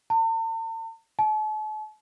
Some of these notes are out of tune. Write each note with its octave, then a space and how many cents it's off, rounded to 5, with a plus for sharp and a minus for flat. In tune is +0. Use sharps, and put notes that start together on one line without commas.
A5 +45
A5 -45